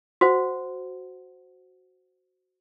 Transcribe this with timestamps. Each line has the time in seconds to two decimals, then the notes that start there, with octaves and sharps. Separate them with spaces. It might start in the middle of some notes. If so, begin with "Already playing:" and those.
0.21 F#4 C5 F#5